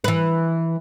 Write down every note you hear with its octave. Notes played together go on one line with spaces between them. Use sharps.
E3 B4